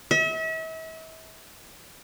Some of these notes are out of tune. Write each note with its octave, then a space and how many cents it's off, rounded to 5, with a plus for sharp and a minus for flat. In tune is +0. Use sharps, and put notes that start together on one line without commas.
E5 -40